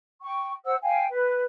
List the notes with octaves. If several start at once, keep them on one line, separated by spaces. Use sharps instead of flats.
G5 C#6
C5 F#5 E6
F5 G5 G#5
B4